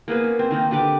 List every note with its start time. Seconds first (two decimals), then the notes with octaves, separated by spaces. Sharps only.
0.08 A#3 B3 G#4 B4
0.24 C#4
0.39 C4
0.51 D#3 A#3 D#4
0.71 D3 G4 B4 D6